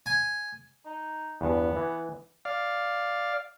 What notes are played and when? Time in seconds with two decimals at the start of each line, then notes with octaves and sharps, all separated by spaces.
0.06 G#5
0.85 D#4
1.41 E2 G2 B3
1.76 E3
2.45 D5 F5